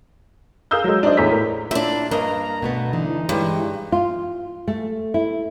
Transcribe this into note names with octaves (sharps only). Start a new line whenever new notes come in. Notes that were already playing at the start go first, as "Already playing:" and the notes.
G#4 A#4 F5 D#6 E6 G6
F#3 G#3
D4 D#4 C5 D5 D#5
E2 A2 G#4 C#5 B6
A2 A#4
A#2 D4 E4 E5
G2 A#3 A#4 D#5 A#5
B2 A3 B3
D3 E3 D#4
G2 G3 G#3
F4
A3
E4